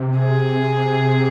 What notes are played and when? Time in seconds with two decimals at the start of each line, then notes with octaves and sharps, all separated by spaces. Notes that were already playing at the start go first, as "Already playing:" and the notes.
Already playing: C3
0.18 G#4